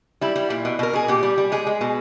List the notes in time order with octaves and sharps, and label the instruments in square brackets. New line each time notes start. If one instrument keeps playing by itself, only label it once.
[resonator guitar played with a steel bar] G3 E4
G3
A#2
B2
B2 A#4
B2 G#4
A#2 G4
G3
G3
G#3 G#4
G#3
B2